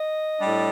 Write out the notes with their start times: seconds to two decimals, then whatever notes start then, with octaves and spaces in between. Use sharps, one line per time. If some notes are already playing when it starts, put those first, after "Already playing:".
Already playing: D#5
0.40 A2 G3 D4